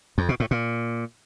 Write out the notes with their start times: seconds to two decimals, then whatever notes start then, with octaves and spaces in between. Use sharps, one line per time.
0.18 F2
0.29 B2
0.40 A2
0.51 A#2